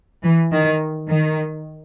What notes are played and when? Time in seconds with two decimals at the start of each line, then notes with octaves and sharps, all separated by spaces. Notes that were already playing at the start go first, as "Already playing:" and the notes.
0.24 E3
0.52 D#3
1.09 D#3